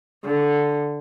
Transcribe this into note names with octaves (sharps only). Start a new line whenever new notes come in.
D3